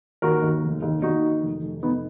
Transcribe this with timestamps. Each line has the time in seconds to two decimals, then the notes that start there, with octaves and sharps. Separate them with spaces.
0.22 D#2 F#4 A#4
0.42 D#2
0.63 F1
0.82 D#2
1.02 D#2 D#4 F#4
1.22 D#3
1.43 F1
1.62 F1
1.83 F1 B3 D#4